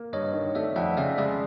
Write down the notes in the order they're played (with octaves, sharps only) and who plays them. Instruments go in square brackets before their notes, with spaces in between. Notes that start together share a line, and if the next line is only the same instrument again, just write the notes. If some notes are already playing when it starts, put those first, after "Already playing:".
Already playing: [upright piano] A#3
[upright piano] G2 [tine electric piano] C#5 D#5
[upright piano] D#3
[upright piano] A3 [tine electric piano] D5 E5
[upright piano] F2 [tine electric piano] E5 F#5
[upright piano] C#3 [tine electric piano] D5 E5
[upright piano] G#3 [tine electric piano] D5 E5